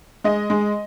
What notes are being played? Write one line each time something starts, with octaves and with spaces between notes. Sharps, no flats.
G#3 D#5
G#3